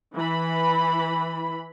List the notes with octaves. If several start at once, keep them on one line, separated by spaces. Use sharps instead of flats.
E3 B5